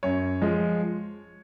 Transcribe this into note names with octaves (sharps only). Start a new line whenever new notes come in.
F#2 C#5
F3 G#3